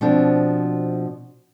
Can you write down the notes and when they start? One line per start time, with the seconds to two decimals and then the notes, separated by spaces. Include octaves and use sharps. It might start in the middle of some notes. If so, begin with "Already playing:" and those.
0.01 B2 F3 C4 D4